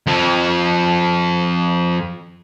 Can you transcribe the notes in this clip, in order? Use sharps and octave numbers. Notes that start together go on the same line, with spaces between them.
F2 F3